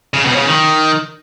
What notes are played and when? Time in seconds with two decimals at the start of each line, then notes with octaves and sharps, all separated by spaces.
0.14 C#3
0.25 B2
0.36 C#3
0.45 D#3